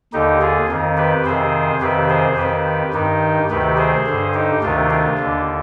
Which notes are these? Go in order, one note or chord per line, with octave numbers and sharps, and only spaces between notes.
D#2 D3 D#4 G4
F4 G#4
F2 D#3
G4 B4
F2 C3 D#3 G#4 C5
F2 C3 D#3 G4 B4
G#4 C5
F2 D#3 G4 B4
G2 D#3 D#4 G4
D2 C3 D#3 G4 B4
G#4 C5
G2 D3
D#4 G4
D2 C3 D#3 D4 F4
D4 F4
D#2 D3